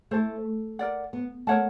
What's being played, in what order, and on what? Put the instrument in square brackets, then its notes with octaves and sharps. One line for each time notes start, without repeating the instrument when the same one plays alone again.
[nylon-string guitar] A3 [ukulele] E4 A4 C5
[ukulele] A#4 D5 F#5
[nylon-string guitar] B3
[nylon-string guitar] A3 [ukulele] A#4 C#5 F#5 A5